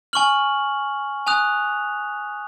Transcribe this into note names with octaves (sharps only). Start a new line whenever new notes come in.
G#5 C#6 F6 F#7
G#5 D#6 F#6 F7